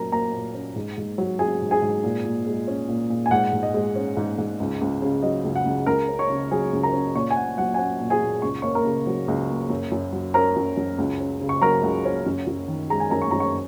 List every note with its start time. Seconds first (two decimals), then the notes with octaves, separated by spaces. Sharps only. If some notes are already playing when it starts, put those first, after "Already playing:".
Already playing: A#2 F#3 C#4 A#4 A#5
0.12 A#3 A#4 A#5
0.33 A#2
0.54 C#4
0.76 G#2
0.98 G#2
1.18 F#3
1.39 C#4 G#4 G#5
1.62 G#2
1.71 G#4 G#5
1.82 G#2
2.04 A#2
2.25 A#2
2.47 G#3
2.67 C#4
2.89 A#2
3.10 A#2
3.26 G#5
3.31 G#2 F#5
3.53 G#2
3.63 D#5
3.74 G#3
3.96 C#4
4.17 G#2
4.38 G#2
4.60 C#2
4.81 C#2
5.02 C#3
5.23 F#3 D#5
5.45 C#2
5.56 F#5
5.66 C#2
5.86 C#2 A#4 A#5
6.08 C#4
6.19 C#5 C#6
6.30 C#3
6.51 F#3 G#4 G#5
6.73 C#2
6.83 A#4 A#5
6.93 C#4
7.15 A#2 C#5 C#6
7.31 G#5
7.36 A#2 F#5
7.58 F#3 F#5
7.74 G#5
7.78 C#4 F#5
8.01 A#2
8.10 G#4 G#5
8.21 A#2
8.42 C#2 C#6
8.62 A#3 C#5 C#6
8.75 A#4 A#5
8.85 C#3
9.07 F#3
9.28 C#2
9.50 A#3
9.70 F#2
9.92 F#2
10.12 F#3
10.34 C#4 A#4 A#5
10.56 F#2
10.77 F#2
10.98 C#2
11.20 C#4
11.41 C#3
11.49 C#6
11.62 F#3 A#4 A#5
11.83 C#2
12.05 C#4
12.26 F#2
12.47 F#2
12.68 D#3
12.90 G#3 A#5
13.00 G#5
13.10 F#2 A#4 A#5
13.22 C#6
13.31 F#2 A#5
13.40 C#5 C#6